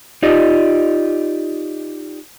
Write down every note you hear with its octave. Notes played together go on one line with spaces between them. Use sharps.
D#4 F4 G4 D5 D#5